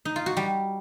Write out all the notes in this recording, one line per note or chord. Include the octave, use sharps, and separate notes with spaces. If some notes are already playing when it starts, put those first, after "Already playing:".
D#4
F4
F#4
G3